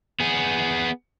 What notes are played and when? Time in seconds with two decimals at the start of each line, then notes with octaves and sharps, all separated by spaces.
0.20 B3 G#4